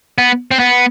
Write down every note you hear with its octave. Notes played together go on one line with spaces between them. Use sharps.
B3
C4
B3